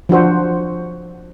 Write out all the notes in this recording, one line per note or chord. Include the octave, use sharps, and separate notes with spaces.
F3 D4 F#4 C5